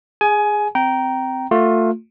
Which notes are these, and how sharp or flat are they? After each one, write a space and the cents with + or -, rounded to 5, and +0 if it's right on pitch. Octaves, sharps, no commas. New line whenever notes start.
G#4 -10 G#5 +20
C4 -10 G5 -15 A#5 +5
A3 +25 F4 +25